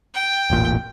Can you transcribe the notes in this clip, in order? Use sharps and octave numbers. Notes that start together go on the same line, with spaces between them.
G5
E1 A1 A#2